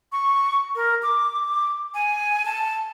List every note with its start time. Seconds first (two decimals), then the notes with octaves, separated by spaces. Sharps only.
0.12 C#6
0.76 A#4
1.03 D6
1.94 G#5
2.45 A5